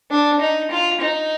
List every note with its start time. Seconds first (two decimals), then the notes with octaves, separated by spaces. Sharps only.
0.11 D4
0.41 D#4
0.71 F4
1.01 D#4